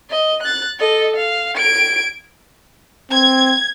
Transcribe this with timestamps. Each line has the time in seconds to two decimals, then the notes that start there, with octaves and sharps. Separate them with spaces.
0.10 D#5
0.43 F#6 A6
0.79 A4 D#5
1.16 F5
1.57 G#6 D7
3.12 C4 G#6